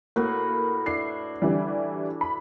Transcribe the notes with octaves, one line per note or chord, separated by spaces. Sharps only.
A2 A#3 F#4 B4
D4 E4 C7
D3 E3 G3
B5